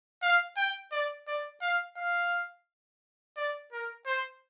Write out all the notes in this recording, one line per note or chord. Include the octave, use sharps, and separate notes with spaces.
F5
G5
D5
D5
F5
F5
D5
A#4
C5